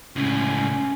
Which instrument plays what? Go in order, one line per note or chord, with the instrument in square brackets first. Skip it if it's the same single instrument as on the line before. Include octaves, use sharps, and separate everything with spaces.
[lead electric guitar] C#2 A2 [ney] C#4